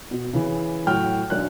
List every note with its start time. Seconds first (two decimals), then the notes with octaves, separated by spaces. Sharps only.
0.11 B2
0.33 C#3 E3
0.87 A2 F#3 F#4 G5 F6
1.30 B1 D4 F#6